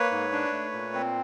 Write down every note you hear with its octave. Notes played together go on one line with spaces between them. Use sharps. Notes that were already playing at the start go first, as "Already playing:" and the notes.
Already playing: A#3 B4 C#5
G#2
D4
A3
A#2
C4